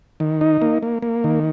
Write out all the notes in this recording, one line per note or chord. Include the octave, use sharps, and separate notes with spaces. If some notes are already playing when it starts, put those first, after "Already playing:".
D#3
D#4
A#3
A#3
A#3
D#3